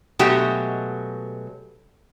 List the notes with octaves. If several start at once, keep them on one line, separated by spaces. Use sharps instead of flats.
B2 F#3 G#3 A3 F#4 G4